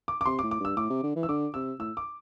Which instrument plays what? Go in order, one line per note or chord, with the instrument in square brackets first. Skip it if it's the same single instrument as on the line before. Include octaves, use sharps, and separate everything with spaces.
[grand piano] D6
D6
[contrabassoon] C3 [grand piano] C6
[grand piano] D6
[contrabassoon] A2
[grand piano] D6
[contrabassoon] G2 [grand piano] E6
[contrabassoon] A2 [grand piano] D6
[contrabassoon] C3
D3
E3
[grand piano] E6
[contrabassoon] D3 [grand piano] D6
[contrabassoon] C3 [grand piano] E6
[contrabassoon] A2 [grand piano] E6
[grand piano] D6